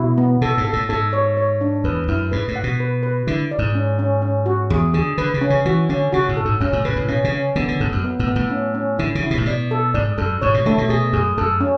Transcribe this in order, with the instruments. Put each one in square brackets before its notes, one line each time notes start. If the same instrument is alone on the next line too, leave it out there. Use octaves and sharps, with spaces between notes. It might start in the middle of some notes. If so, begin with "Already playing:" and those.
Already playing: [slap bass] B2 [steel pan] E4 F#4
[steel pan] B3
[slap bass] B2 [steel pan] A4
[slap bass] G#2
[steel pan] A4
[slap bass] A2
[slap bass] G#2 [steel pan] A4
[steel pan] C#5
C#5
D4
[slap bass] E2 [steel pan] B4
[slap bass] F#2 [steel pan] E4
[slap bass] G#2 [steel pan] B4
[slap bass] A2
[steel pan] F#5
[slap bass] B2
[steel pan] B4
B4
[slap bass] D3 [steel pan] E4
[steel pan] D5
[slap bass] G#2
[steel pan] C#4
C#4
C#4
F#4
[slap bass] E2 [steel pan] G#4
[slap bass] D3 [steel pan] G#4
[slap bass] D3 [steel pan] B4
[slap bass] C#3
[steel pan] C#4
[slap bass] C#3
[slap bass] E3 [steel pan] F#4
[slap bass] D3 [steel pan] C#4
[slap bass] C#3 [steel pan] F#4
[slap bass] A2
[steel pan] A4
[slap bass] G#2
[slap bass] F#2 [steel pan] C#4
[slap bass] A2
[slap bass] C#3 [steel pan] B4
[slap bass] G#2
A2
[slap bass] B2 [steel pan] C#4
[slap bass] C#3
[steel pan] C#4
[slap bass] D3 [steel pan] B3
[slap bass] D3
[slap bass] G#2 [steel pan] A4
[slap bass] F#2
[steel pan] B3
[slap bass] A2
[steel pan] B3
[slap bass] A2
[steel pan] C#4
C#4
[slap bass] D3 [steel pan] E4
[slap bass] C#3
[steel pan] E4
[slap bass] B2
A2
[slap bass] B2 [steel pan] D5
[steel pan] A4
[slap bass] G#2 [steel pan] D5
[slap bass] F#2 [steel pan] A4
[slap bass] G#2 [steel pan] C#5
[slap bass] B2
[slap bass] D3 [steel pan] A3
[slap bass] B2
[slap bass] B2 [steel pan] G#4
[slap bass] F#2 [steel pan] G#4
[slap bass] F#2 [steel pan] A4
[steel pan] C#4